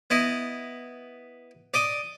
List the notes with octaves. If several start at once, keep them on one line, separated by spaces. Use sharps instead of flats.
B3 E4 D#5
D5 D#5 D#6